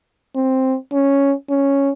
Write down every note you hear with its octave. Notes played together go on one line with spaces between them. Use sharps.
C4
C#4
C#4